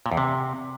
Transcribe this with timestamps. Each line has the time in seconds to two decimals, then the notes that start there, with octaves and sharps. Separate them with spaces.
0.06 A#2
0.12 E2
0.17 C3